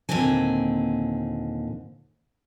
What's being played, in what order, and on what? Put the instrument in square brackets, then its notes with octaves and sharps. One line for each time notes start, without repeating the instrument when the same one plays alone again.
[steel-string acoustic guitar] D#2 A#2 D3 C4 G#5